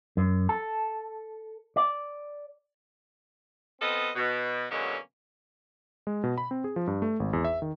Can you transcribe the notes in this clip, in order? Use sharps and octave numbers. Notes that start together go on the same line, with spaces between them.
F#2
A4
D5
B3 C4 F4 A4 D#5
B2
B2 D3 F#3 G#3 A#3 C#4
G#3
B2
B5
C4
G#4
F3
G2
A3
G#1
E2
E5
D#3